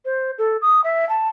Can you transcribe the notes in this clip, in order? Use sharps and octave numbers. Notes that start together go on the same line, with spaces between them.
C5
A4
D#6
E5
A5